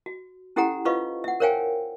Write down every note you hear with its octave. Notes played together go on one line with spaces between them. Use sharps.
F#4
C#4 E4 G4 A4 F#5 A#5
F4 B4 C5 D#5 F5 C#6
E5 F#5
A#4 C5 C#5 F5 G5 G#5